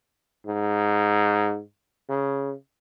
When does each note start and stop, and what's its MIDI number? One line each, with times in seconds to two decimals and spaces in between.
0.46 1.60 44
2.09 2.53 49